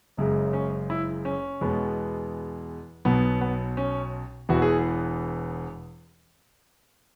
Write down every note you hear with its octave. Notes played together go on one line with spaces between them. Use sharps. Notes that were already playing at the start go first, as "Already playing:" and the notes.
F#1 F#2 C#3 G#3
C#4
E4
C#4
E2 B2 G#3 B3
B1 B2 F#3 B3
B3
C#4
E1 E2 E3 B3 F#4
G#4